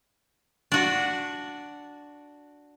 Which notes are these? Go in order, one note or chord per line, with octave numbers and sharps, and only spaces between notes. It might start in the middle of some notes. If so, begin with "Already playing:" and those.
D4 F#4